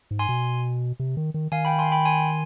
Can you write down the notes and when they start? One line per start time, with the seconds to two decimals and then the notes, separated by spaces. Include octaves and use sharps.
0.11 G#2
0.19 G#5 C6
0.29 B2
1.00 C3
1.17 D#3
1.34 D#3
1.52 D#3 F5 G#5
1.65 G5 B5
1.79 G#5 C6
1.92 G5 B5
2.05 G#5 C6